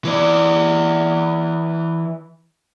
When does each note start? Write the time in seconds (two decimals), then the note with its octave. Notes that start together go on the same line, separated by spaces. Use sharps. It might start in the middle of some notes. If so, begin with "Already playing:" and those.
0.05 E3 D5